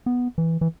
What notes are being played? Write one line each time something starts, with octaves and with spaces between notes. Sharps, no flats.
B3
E3
E3